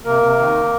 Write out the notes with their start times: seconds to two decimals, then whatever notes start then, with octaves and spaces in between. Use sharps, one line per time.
0.05 C3 A#3 A#4
0.23 C3
0.38 D#3